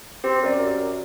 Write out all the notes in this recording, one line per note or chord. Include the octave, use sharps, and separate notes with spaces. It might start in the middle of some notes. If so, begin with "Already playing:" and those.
C4 G4
F#2 A#4 D5